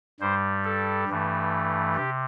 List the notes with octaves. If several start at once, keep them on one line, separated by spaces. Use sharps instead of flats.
G2 G3 C5
A4
G2 E3 A3
C3 G4